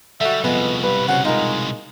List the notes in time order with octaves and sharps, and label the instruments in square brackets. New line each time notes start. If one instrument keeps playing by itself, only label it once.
[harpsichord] D3 F#4 [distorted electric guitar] G3 [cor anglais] E5
[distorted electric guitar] C2 B2 [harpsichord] F2 G#3 D#5 [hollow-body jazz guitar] B3 [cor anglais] B4
[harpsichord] G2 [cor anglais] B4
[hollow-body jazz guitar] C#3 [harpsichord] B3 F#4 C5 [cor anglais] F#5
[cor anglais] G#3 [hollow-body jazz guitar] D#4 A#4 [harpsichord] F4 A#5